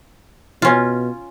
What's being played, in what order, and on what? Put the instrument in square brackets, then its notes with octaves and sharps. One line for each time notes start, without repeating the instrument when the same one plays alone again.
[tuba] B2 [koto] C#4 F4